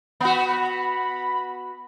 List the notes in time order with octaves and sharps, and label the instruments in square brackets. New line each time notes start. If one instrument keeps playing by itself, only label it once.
[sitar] B3 F#4 [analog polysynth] B5